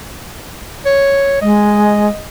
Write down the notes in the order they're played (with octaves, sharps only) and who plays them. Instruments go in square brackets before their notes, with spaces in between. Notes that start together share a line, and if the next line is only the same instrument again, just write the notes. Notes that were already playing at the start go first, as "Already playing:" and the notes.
[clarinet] C#5
[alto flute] G#3 [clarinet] D#5